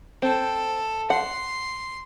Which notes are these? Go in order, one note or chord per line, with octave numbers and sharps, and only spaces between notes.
C4 A4
F#5 C6